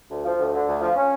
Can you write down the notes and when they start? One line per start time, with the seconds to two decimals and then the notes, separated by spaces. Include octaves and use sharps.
0.10 D2
0.25 F3
0.39 D2
0.53 D3
0.67 D2
0.80 F3
0.95 C#4